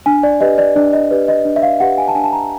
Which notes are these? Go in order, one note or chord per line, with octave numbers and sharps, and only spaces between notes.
D4 G#5
D5
G4 B4 D#5
D5
D4 D5
D#5
G4 B4
D#5
D4
E5
F5
G4 B4 F#5
G#5
A5
D4 G#5
A5
A#5